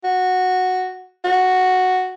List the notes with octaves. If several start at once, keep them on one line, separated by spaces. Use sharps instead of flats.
F#4
F#4